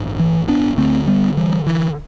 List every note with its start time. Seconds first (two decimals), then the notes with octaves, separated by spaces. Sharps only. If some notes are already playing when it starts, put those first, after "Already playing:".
Already playing: A1 G2
0.19 E3
0.48 B3 D4
0.78 D2 D3 A3 C4
1.07 G3 B3
1.37 E3 G3
1.67 E3